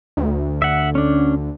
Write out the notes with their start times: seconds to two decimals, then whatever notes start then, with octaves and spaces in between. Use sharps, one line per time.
0.17 D2
0.62 E5 F#5
0.95 C#4 D4